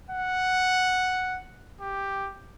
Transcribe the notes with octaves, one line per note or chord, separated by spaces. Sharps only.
F#5
G4